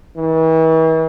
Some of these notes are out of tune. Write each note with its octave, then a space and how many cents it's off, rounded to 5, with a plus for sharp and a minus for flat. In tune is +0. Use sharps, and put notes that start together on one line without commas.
E3 -40